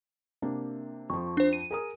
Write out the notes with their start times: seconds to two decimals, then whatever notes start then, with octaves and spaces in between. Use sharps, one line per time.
0.42 C3 A#3 D4
1.10 F2 F3 C#6
1.37 D4 C5
1.53 D#7
1.71 G#4 A#4 D#6